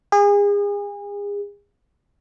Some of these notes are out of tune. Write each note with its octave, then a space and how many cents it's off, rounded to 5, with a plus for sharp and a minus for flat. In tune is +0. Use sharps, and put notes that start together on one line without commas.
G#4 -35